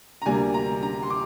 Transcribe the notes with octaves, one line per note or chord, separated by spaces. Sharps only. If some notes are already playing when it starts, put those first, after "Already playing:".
A#5
D2 C3 G3 A#3 G#5
A#5
A#5
C6
D6